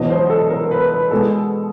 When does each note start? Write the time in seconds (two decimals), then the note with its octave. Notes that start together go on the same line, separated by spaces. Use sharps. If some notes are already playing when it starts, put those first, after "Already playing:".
Already playing: E1 E2 B2 F#3 D#5
0.10 C5
0.30 A4
0.50 A#4
0.71 B4
0.91 B4
1.11 B2 G#3 A4